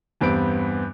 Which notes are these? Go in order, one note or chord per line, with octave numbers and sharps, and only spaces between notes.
E2 G2 B3 C4 D7